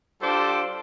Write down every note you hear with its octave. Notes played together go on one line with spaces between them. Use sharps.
G3 D4 F4 A4 C5 D6